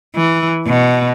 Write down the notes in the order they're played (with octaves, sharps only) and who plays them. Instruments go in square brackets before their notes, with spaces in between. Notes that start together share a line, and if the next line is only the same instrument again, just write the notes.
[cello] E3
B2